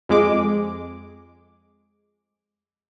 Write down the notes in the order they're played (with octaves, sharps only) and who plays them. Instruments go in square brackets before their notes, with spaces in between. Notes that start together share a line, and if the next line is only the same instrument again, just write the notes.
[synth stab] F2 G#3 D6